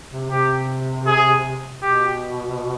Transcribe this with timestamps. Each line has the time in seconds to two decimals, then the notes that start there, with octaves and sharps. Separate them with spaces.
0.12 C3
0.30 C3 G4
1.06 G#4
1.82 B2 G4